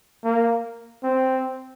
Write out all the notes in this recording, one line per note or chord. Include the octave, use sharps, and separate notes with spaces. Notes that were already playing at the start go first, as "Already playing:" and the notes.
A#3
C4